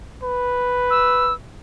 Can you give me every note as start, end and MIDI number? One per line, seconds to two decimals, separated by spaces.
0.23 1.34 71
0.90 1.33 88